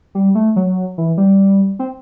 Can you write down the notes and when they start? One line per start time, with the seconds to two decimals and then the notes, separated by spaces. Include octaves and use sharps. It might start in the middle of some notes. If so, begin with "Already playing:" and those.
0.15 G3
0.35 A3
0.56 F#3
0.98 E3
1.18 G3
1.79 C4